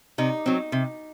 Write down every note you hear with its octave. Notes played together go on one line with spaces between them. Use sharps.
C3 D#4
F#3 C4
C3